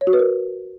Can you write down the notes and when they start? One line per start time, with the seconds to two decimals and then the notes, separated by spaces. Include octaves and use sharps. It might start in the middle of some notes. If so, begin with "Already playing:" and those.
0.01 C#5
0.07 F#4
0.13 B4
0.19 A#4